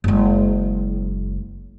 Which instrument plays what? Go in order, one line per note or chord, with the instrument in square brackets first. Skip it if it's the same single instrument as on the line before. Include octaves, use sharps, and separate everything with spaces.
[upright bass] F#1 G#3